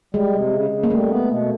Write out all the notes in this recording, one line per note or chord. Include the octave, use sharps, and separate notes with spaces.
G3 G#3
C3
C#3
C#3
A#3
G3 A3
B3
B2